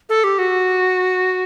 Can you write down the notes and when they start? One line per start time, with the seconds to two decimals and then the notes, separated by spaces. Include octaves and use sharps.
0.09 A4
0.24 G4
0.38 F#4